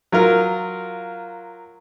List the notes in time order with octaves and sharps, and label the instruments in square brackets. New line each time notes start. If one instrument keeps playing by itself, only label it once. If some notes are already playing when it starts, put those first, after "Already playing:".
[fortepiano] F#3 F4 A#4